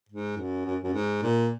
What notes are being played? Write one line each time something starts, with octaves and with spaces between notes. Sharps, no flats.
G#2
F#2
F#2
F#2
G#2
A#2